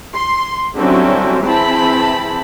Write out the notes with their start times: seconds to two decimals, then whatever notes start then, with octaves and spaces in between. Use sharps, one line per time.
0.15 C6
0.76 D3 F#3 G3 C4 C#4 E4
1.45 E3 C4 E4 G#4 A5 B5